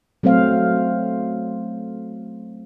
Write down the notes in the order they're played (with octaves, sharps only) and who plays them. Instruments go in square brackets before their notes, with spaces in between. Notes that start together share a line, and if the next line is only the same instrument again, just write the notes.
[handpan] F#3 A3 C4 C5 F5